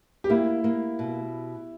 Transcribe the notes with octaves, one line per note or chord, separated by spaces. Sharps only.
G4
A#3 E4
A#3
B2